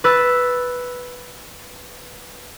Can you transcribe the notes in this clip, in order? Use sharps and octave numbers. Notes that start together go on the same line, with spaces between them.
B4 E6 A6